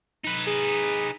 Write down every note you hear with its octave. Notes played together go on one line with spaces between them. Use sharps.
D#4 B4
G#4